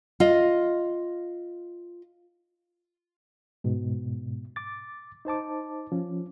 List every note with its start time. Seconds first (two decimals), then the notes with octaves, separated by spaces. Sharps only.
0.20 F4 D#5
3.64 G#2 B2
4.56 D6 A6
5.25 D#4 C5 A5 D6
5.92 F3 C#4